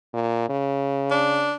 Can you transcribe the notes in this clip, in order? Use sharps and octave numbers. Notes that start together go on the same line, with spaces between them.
A#2
C#3
D4